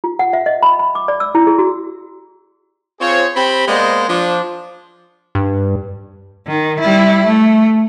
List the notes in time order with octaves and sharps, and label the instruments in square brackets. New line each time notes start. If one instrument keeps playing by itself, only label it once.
[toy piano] F4
F#5
E5
D#5
B5
B5
D6
D5
E6
E4
G#4
F#4
[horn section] C4 F4 G#4 C5 C#5
C4 G4 G5 B5
G#3 A#3 B3 C5 D5 D#5
F3 D4 C5
[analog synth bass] G2
[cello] D#3
G3 E4
A3